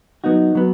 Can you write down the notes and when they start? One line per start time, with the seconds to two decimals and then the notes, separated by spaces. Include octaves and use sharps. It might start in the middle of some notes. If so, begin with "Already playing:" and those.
0.24 F#3 B3 D#4 F#4
0.55 F#3 B3